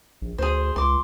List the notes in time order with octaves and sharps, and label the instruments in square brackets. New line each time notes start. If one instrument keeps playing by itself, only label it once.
[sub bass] A#1
[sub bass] D2 [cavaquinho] G#4 C5
[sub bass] C#2 [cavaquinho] C6 D6